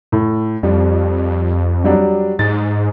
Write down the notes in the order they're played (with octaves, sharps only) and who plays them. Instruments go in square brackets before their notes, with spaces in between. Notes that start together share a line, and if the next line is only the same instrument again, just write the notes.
[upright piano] A2
[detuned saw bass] F2 [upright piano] G3
[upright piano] F#3 G3 D4
[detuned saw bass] G#2 [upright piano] A6